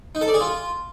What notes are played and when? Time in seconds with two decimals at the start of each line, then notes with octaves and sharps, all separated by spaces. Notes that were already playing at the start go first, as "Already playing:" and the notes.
0.15 D#4
0.21 A4
0.28 D5
0.34 G#4
0.41 F4